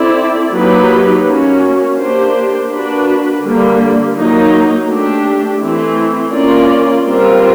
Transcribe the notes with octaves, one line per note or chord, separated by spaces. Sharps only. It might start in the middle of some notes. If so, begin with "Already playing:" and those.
Already playing: C4 E4 A4 D5
F#3 A#3 D#4 G4 B4
A#3 C#4 F#4
A#3 D4 G4 C5
A#3 D4 F#4 B4
D3 G3 A#3
F#3 A#3 D#4
A3 D4 G4
E3 A3 C4 E4
A#3 C#4 F4 A#4 D5
G3 C4 F4 A#4